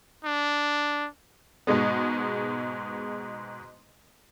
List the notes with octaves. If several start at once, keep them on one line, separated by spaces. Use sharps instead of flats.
D4
G#2 B2 G#3 B3